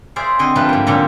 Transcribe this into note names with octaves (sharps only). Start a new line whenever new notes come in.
G#4 C5 D5 E5 F5
D3 C4 G#4 D#5
F3 G3 A3 D4 G4 B4
G#2 A#3
A#2 D3 G3 C#4 G4